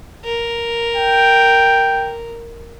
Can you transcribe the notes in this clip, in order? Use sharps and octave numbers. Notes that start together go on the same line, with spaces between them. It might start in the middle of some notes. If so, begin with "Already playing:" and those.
A#4
G5